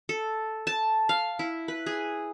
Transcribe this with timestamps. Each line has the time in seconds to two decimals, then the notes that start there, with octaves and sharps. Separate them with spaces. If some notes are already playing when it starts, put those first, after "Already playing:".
0.09 A4
0.67 A5
1.09 F5
1.39 E4
1.68 B4
1.86 G#4